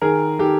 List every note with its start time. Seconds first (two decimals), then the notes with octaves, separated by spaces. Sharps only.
0.02 D#3 G#4 A#4
0.39 D#3 G4 A4